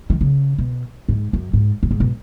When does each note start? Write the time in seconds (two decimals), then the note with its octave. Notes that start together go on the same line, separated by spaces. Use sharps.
0.10 D#3
0.21 C#3
0.58 B2
1.09 G#2
1.33 F#2
1.53 G#2
1.83 F#2
1.91 G#2
2.00 B2